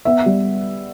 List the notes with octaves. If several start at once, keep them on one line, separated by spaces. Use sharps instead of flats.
B3 E5
G3